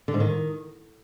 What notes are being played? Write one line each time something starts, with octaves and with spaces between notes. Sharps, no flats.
D3
G#2
D#3